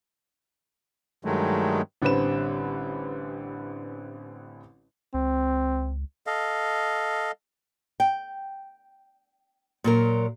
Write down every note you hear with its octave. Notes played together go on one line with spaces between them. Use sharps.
G2 D#3 F#3 G#3 A3
A1 D3 G3 C4 B4 E7
C#2 C4
A4 D#5 F5
G5
A#2 F#3 A#4